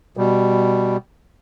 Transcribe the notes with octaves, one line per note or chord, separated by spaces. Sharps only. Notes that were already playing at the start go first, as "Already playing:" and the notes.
B2 G3